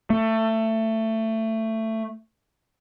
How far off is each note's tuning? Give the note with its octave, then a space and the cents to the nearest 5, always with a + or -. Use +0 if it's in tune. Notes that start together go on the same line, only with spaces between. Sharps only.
A3 +20